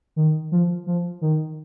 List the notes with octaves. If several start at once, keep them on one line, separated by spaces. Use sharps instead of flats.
D#3
F3
F3
D#3